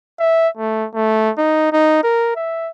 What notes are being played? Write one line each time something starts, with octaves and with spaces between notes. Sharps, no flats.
E5
A3
A3
D#4
D#4
A#4
E5